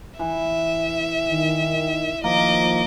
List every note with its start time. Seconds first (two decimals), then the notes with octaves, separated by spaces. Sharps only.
0.19 E3 E5
1.30 D#3
2.24 D#3 F3 A#3 D#5 D6